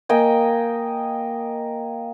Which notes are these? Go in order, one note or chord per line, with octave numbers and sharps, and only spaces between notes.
A#3 D#5 G5 G#5